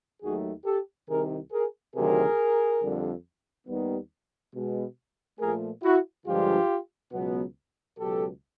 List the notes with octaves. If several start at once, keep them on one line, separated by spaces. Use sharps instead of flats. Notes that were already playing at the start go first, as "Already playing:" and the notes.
D#2 D#3 F#3 A3 F#4 G#4
G4 A4
C2 C3 D#3 G#4 A#4
G#4 A#4
D2 C3 D#3 F#3 G#4 A#4
F2 D3 G3
D#2 D#3 G3 B3
B2 G#3 B3
A#2 F3 A3 G#4 A#4
E4 F#4
G2 D3 F3 G#3 F4 G4
C#2 B2 F#3 B3
C#2 B2 F#3 G4 A4